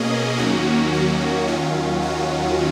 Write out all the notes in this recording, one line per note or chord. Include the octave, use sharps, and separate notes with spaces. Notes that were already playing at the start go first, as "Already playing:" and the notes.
Already playing: B2 A#3 C#4 G#4 D#5
D#2 D#3 F#3 A#3 C#4 F#4
F#4
D#2 D#3 F#3 C#4 F4
F#4